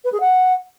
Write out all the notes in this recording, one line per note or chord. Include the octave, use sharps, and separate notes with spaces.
B4
G#4
F#5